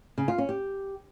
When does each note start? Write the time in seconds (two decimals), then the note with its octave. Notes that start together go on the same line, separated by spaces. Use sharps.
0.18 C#3
0.28 F4
0.38 C#4
0.49 G4